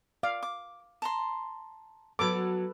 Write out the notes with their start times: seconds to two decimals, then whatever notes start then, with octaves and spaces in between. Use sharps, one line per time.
0.23 D5 F5
0.43 D6
1.02 A5 A#5 C6
2.19 F#3 B3 A4 B4 D6